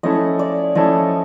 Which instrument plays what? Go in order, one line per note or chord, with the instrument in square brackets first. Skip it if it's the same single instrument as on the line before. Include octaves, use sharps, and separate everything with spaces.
[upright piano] F3 A3 C#4 E4 A4 [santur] D#5
[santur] D5
[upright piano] F3 A3 C#4 E4 A4 [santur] D#5